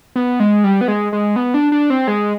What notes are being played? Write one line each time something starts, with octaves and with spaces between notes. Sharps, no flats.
B3
G#3
G3
B3
G#3
G#3
B3
D4
D4
C4
G#3